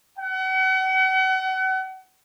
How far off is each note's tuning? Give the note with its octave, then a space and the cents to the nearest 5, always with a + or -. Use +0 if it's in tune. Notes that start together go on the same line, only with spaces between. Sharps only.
F#5 +35